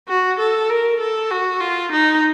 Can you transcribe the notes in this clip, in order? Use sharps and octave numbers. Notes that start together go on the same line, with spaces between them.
F#4
A4
A#4
A4
F#4
F4
D#4